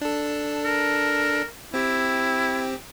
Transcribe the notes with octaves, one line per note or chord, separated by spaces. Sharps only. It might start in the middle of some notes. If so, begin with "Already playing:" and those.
D4 A4
A#4
C4 E4 G4